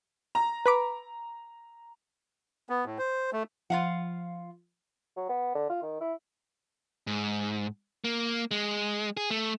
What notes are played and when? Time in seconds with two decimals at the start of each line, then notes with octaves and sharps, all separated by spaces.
0.35 A#5
0.66 B4 B5 D6
2.69 B3
2.86 A2
2.98 C5
3.33 A3
3.70 F3 F4 F5 F#5
5.16 F#3
5.29 B3
5.55 D3
5.70 F4
5.82 D#3
6.01 E4
7.07 G#2
8.04 A#3
8.51 G#3
9.17 G#4
9.30 A3